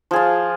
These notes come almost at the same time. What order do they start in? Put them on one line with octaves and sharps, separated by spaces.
F3 G#4 F4